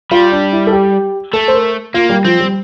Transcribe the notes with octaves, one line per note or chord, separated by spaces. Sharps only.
G3 F4
D4
E4
A4
G4
A3 A4
C5
A#4
A#3 F4
G3
F3 C4
G3